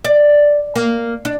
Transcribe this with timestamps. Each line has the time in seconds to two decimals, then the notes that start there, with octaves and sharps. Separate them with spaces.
0.05 D5
0.75 A#3
1.25 D4